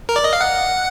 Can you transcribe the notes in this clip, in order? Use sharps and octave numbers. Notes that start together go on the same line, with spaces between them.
A#4
D5
D#5
F5
F#5